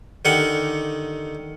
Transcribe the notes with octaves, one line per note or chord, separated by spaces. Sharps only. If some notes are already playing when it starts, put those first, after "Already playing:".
D3 D#3 G4 F#5